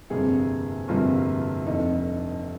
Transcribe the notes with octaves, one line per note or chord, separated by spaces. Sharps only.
G1 F2 C3 G3 A#3 G#4
G1 F2 C3 G3 A#3 F4
F1 F2 D3 D#4